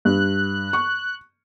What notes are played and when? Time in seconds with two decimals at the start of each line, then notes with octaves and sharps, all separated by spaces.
0.05 G2 F#6
0.73 C#6